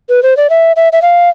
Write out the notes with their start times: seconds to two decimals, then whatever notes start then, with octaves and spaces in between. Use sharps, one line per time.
0.09 B4
0.23 C5
0.37 D5
0.50 E5
0.76 E5
0.93 E5
1.02 F5